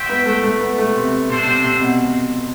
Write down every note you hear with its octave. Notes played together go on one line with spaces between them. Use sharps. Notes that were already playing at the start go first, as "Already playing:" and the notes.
Already playing: F#4 C5 E5 G5
B3
A3
A3
B3
A3
C3
C3 D4 A4 C5
C3
C3
B2